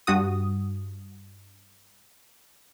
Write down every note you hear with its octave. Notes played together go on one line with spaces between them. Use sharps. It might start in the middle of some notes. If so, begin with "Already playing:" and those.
G2 F#4 D#6